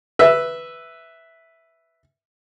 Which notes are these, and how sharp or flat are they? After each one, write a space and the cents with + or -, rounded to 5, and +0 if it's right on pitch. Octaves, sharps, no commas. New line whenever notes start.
B4 +0 E5 +0